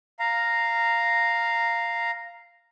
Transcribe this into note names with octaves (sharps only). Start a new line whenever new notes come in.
F5 A#5